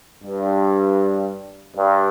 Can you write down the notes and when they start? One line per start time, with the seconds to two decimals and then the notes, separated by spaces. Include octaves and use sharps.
0.23 G2
1.76 G2